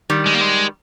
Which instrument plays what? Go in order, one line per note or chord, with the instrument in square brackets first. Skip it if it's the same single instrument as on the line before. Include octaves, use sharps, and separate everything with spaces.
[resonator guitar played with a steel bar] D#3 G3
[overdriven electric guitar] G#3
A#3
G#3